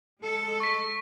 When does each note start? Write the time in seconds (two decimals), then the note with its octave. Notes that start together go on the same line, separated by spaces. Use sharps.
0.19 G#3 A4
0.60 C#6 B6